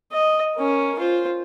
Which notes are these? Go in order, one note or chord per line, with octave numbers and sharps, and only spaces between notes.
D#5
C#4 A#4
F4 C5